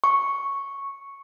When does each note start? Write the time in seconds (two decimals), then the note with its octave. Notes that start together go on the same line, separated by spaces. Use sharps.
0.04 C#6